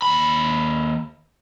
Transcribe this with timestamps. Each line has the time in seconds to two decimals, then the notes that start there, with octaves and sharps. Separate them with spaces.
0.02 D#2 B5